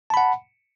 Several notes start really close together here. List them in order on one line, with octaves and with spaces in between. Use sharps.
A5 B5 F#5